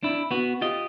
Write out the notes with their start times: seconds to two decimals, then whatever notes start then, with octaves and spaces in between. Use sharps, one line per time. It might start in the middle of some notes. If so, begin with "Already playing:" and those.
0.03 D4 E4
0.31 B3 F#4
0.61 F4 G4 D#5